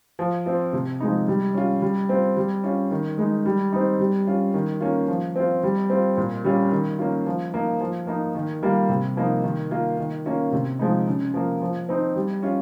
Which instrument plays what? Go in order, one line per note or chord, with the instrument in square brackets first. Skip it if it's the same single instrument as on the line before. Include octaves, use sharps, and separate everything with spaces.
[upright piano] F3
C4 F4
C3
F3 G#3 D#4
G3
C#4 F4
G3
C4 F4
G3
C#4 F4
D#3
G#3 D#4
G3
C4 D#4
G3
C#4 F4
D#3
A#3 C#4 F4
F3
C4 F4
G3
C4 F4
A#2
G3 C#4 F4
D#3
A#3 C#4 F4
F3
A#3 D#4
F3
A#3 D#4
D#3
G3 A#3 F4
C3
F3 A#3 D#4
D#3
A#3 F4
D#3
A#3 C#4 F4
C3
F3 G#3 D#4
C#3
F3 A#3
F3
C4 D#4
G3
C#4 F4